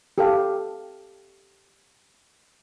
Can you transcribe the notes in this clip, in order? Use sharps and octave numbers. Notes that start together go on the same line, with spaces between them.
G4 A4 F5